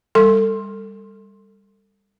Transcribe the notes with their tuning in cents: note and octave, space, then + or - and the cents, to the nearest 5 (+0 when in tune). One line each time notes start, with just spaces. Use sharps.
G3 +20 A4 +25 C6 +15